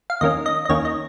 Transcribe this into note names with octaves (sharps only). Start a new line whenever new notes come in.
F5
D#2 D#3 A#3 C#4 D#5
D#5
D#5
D#2 D#3 A#3 C#4 C#5
D#5